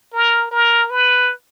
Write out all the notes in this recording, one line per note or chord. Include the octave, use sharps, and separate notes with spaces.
A#4
A#4
B4